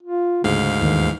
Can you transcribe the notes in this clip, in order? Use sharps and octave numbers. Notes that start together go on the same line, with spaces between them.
F4
D2 G#2 C#3 F5
D#2 D#3 E3